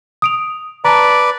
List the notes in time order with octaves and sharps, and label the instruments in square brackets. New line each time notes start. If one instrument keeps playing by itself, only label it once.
[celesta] D#6 D7 F7
[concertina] B4 D5 [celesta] A5 A#5